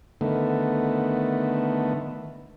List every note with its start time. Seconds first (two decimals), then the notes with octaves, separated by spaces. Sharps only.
0.21 D3 D#3 A3 B3